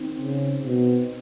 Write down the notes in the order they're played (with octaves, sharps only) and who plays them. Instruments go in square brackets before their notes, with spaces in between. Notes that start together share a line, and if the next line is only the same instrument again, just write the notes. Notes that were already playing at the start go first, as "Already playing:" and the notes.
Already playing: [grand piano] D#3 C4
[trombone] C#3
B2